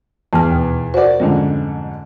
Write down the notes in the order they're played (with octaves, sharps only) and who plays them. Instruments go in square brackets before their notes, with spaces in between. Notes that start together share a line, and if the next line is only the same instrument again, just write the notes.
[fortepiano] E2 [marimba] A5 F6
[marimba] D#2 B2
[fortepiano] F#4 D5 [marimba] A#4 C5
[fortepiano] F2 G#2 D3 [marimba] G3 C#4